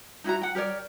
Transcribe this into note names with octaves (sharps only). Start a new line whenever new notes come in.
D#4 E4 F#4 A#5
F#5 G5
G4 A#4 C#5 D5